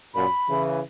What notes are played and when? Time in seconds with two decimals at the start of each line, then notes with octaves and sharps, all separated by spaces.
0.14 F#2 A#2 B5
0.48 C#3 E3